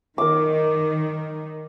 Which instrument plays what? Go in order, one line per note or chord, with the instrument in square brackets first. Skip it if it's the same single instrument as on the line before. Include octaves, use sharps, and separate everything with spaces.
[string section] D#3 [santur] A#4 D6